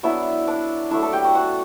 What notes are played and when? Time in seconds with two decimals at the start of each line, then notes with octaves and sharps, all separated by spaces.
0.03 F#3 B3 D4 E4 E5
0.47 D4 D5
0.91 F#3 A3 D4 E4 E5
1.02 A4 A5
1.13 G4 G5
1.24 F#4 F#5
1.35 F#4 F#5